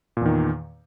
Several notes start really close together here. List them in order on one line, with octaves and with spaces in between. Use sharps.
A#2 E2 D#3